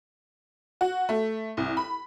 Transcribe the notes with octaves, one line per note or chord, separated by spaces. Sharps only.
F#4
A3
C2
B5